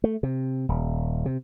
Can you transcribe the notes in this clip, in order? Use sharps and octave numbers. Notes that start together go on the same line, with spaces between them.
A3
C3
D#1
C3